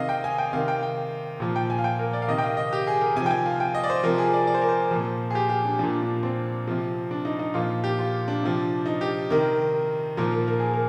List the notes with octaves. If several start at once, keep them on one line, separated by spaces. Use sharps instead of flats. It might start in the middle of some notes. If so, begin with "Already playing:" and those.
Already playing: C3 D#3 D#5 F5
G5
G#5
G5
C3 D#3 F5
G5
G5
A#2 F3
G5
G#5
F5
G5
A#4
D5
F5
C3 D#3 D#5
G5
F5
D#5
G4
G#4
A#4
C3 F3 G#5
G5
G#5
F5
G5
D#5
D5
C5
C3 F3 A#4
G#4
D5
D5
C5
A#4
C5
A#2 F3
G#4
G4
G4
D4
A#2 F3 D4
D4
C4
C3 F3
D4
D#4
D#4
A#2 F3 F4
G4
F4
D4
C3 F3
D#4
G4
C3 D#3 A#4
A#2 F3 A#4
A#4
A#4
G#4
A#4